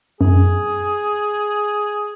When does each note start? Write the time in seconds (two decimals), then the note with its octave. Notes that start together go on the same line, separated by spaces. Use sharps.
0.21 F#2 G#4